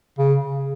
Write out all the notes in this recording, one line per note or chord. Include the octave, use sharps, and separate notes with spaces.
C#3